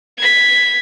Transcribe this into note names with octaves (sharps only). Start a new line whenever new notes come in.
G#6 B6